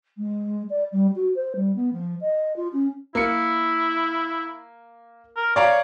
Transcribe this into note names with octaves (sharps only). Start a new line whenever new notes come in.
G#3
D5
G3
F#4
C5
G3
B3
F3
D#5
F4
C#4
A#3 E4 C#7
A#4
C#5 D5 F5 A#5